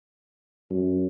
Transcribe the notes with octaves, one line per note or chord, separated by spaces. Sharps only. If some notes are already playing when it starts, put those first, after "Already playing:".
F#2